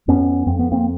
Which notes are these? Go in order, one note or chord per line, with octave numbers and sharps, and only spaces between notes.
F2 B3 C#4
F2 C4
B3
A#3 C4